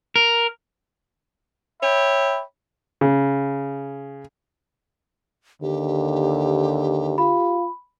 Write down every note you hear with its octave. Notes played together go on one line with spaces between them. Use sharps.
A#4
C#5 E5 G5 B5
C#3
D#2 D3 G4
F4 B5